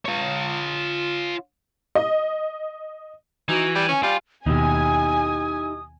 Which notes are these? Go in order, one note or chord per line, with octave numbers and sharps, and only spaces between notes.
F4 C#5
D#5
E3 D#4 F#4
G3
C#4 G#5
G3 F4
D#2 B2 D#4 E4 G4 G#5 D#6